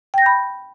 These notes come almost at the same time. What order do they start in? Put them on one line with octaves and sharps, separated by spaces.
G5 A#6 G6 B5